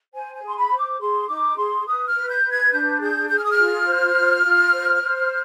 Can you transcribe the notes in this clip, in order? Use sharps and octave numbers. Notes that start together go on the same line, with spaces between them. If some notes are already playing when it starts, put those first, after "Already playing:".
C5 G#5
G#5
G#4 C6
B5
C5
D6
G#4 C6
D#4 D6
G#4 C6
B4 D#6
F6
B4
G6
B4
G#6
D4 G6
G#4 G6
G#4 G6
F6
D#6
F6
F4
C5
F4
F4
C5
C5